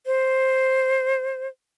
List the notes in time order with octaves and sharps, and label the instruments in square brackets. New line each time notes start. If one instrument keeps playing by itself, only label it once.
[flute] C5